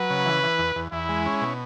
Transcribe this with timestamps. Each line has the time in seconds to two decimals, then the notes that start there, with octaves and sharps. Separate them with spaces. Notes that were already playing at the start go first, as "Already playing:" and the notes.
Already playing: F#3 B4
0.10 C#3
0.26 E3
0.43 E3
0.59 E2
0.76 E2
0.92 E2 E4
1.09 G#3
1.26 C#4
1.41 B2